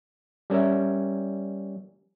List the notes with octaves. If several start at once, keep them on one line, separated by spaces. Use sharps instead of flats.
G3 C#4 A#4 E5